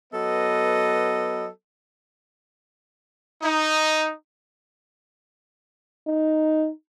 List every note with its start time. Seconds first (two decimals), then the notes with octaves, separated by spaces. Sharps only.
0.13 F#3 B3 A4 B4 D#5
3.42 D#4
6.08 D#4